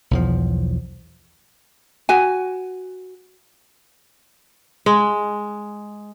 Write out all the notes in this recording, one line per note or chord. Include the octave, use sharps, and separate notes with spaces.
B1 E2 F3
F#4 G#5
G#3